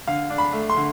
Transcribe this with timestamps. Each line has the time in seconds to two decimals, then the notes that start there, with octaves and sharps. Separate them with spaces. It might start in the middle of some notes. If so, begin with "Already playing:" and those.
0.07 D3 F5
0.30 D4
0.38 B5
0.53 A3
0.70 C6
0.77 D3